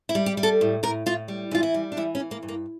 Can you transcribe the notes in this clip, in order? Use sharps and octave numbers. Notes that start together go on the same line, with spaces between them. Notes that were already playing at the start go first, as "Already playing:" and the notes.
E4
G3
G4
G3
A4
A2
A2 A#4
A2 F4
G3
E3 F4
E4
G3
D4
E3 E4
C#4
E3
A#3
G2
A#3